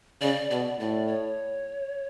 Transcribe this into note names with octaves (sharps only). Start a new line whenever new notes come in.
C#3 D5
B2 D5
A2 D5
C#5